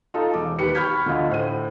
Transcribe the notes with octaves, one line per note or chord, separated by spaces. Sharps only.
D#4 F4 A4
E1 D6
D#2 G4 B4 C#7
B5 C#6 F6 G6 G#6 B6
D2 D3 F4 D#5
A2 C5 D#7